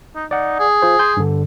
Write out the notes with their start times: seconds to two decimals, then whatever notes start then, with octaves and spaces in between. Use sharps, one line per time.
0.15 D#4
0.31 D#4 D5 F#5
0.59 G#4
0.82 F4 C5
0.99 G#5 C6 G6
1.17 G2 D3